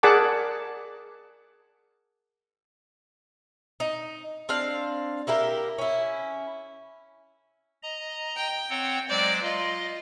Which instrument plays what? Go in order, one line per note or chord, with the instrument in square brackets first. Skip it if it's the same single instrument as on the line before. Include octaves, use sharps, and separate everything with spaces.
[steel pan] G#4 A#4 D5 F#5 A5 D6
[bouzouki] D#4
C4 D4 F5
A#3 E4 G4 A#4
C#4 E4
[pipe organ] D#5 A#5
[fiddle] G5
[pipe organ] C4 C#5 F#5
[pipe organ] F#3 G#3 C5 [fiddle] D5
[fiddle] F4 [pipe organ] D#5